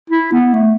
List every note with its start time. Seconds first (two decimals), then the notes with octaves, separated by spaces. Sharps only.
0.10 E4
0.32 B3
0.54 A3